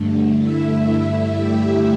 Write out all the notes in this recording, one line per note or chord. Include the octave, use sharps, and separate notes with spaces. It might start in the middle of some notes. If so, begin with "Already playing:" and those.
Already playing: G2 D3 A3
E4 E5
E4
G4